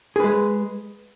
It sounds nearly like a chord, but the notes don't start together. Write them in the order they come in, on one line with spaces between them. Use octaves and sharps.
G#4 B4 G#3